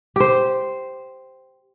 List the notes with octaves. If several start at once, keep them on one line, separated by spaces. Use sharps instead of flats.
G4 C5